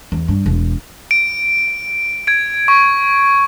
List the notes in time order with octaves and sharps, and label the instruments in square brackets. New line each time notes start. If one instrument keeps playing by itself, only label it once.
[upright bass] E2
G2
E1
[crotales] D7
G#6 D7
C#6